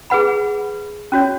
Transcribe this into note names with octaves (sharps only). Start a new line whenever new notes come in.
G#4 B4 F#5 B5
C#4 F#4 C#5